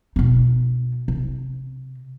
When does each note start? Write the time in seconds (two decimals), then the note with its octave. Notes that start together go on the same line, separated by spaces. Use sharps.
0.16 B2 D#4
1.08 C3